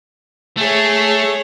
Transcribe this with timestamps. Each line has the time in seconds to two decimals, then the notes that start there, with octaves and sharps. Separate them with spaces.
0.58 A3 G#4 C#5